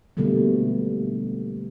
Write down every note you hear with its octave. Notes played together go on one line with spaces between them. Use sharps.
B2 D3 G3 A3 A#3